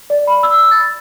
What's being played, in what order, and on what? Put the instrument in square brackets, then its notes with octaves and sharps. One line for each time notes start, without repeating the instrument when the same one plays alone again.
[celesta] D5
B5
E6
A6